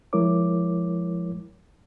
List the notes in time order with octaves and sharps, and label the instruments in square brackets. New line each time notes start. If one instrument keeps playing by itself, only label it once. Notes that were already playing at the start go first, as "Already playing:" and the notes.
[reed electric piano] F3 G#3 E4 A#4 C#5 D6